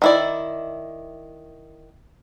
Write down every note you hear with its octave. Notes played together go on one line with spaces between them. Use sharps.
D#3 E4 D5